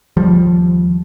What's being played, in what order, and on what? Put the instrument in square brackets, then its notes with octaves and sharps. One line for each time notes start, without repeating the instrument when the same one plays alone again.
[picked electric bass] D#2 F3 G3